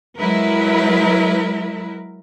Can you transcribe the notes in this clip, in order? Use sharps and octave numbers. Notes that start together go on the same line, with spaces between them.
F#3 G#3 E4 A#4 B4